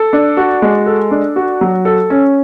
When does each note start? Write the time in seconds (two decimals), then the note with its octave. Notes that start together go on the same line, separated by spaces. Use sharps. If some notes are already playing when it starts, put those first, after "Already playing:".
Already playing: A4
0.13 D4
0.37 F#4
0.62 G#3
0.86 A4
1.11 D4
1.36 F#4
1.61 F#3
1.85 A4
2.10 C#4